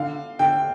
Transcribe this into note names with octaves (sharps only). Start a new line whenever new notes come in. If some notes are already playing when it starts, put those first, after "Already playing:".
Already playing: D3 F5
D3 G5